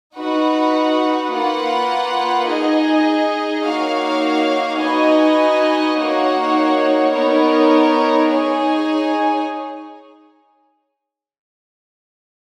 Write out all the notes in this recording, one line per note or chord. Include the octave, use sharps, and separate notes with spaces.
D#4 F#4 B4 F#5
A#3 F4 B4 F#5
D#4 G#4 D#5
A#3 D#4 F#4 C#5 F5
D#4 F#4 B4 D#5 G#5
A#3 D#4 F#4 C#5 F#5
B3 D#4 A#4 C#5
D#4 G#4 C#5 G#5